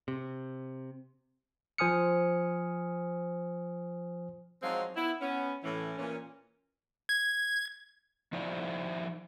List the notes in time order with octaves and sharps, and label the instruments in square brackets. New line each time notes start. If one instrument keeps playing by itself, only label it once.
[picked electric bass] C3
[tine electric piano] F3 C5 G#5 D#6 F6 C#7
[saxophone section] F3 F#3 G#3 C4 D#4 F5
B3 E4
B3 C#4
A2 E3 C#4
A#2 E3 C#4
[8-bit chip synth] G#6
[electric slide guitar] F3 D#4 E4 C5 D5